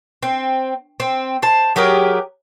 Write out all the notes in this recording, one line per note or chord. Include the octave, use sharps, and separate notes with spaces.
C4
C4
C5 A5
F#3 G4 G#4 A#4